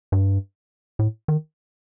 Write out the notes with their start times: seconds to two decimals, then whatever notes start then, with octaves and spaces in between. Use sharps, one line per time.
0.12 G2
0.99 A2
1.28 D#3